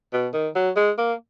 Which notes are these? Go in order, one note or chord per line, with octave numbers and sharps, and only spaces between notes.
B2
D#3
F#3
G#3
A#3